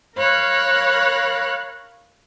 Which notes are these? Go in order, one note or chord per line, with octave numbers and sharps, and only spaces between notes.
A#4 C#5 F5 B5 F#6